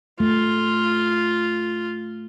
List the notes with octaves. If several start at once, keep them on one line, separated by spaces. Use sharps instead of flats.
A3 F4